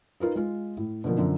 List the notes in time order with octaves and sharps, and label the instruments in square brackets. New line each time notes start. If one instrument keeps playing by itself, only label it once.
[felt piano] D#4 F4 A#4 B4
G#3 F4
A2
B2 D3 F3 A#3
F#2 D3 F3